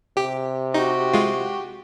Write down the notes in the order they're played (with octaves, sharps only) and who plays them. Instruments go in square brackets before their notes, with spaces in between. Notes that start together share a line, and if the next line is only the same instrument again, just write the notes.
[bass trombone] C3 [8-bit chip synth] G4
[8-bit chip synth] D#4 [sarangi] F#4 [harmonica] G4
[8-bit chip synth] G#3 F4